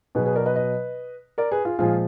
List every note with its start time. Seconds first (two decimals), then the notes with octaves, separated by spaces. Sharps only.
0.15 B2 F#3 G#4 B4
0.25 G#4 B4
0.35 A#4 D5
0.45 B4 D#5
0.56 B4 D#5
1.38 A#4 D5
1.51 G#4 B4
1.65 F4 G#4
1.79 A#2 F3 G#3 F4 G#4